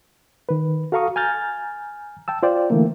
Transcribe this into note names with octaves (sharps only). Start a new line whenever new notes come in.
D#3 B4
F#4 A4 F5 A#5 C#6 D#6
G#5 A#5 F6 G6 A6
G5 A5 E6
F4 C5 D5 G5
D3 E3 A3 A#3